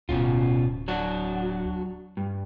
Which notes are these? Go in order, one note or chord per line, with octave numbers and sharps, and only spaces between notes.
D1 B2 C#4 F4
F#3 D4 F#4
G2